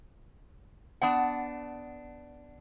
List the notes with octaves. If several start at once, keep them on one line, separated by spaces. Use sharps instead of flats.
B3 D4 F#5